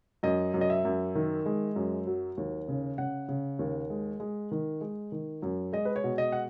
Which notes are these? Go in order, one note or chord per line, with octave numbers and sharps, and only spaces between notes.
F#2 D#5
F#2
D#5
E5
F#2
D#3
G#3
F#2
F#3
D#2
C#3
C#3 F#5
C#3
D#2
G#3
G#3
D#3
G#3
D#3
F#2
G#3 D#5
B4
C#5
B2
D#5
F#5